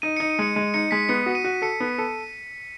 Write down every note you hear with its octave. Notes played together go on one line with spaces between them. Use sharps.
D#4 D#7
D#4 C#7
D#7
G#3 C#7
G#3 D#7
D#4 C#7
G#3 B6
B3 C#7
F#4
D#7
F#4
A4 C#7
B3
A4